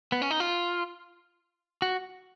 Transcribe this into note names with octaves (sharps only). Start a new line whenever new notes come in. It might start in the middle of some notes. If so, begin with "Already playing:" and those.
B3
C#4
D#4
F4
F#4